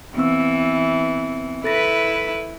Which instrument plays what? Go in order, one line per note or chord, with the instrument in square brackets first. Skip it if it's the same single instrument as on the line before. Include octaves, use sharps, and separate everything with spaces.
[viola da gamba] E3 [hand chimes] B3 C4 E6
[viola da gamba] E4 B4 [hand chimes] A4 A6 A#6